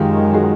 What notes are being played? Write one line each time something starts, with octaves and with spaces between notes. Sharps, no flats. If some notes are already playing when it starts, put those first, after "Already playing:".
Already playing: F#2 D#3 G#3 F4 G4
F#4 G#4